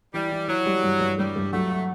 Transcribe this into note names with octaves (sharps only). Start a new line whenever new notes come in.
E3 G3
E3
E3 F#3
G3
G2
G2
G2 G3
G2
F#3 A3
F#4